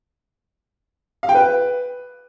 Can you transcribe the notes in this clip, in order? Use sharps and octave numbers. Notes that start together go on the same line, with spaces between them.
F5
G5
B4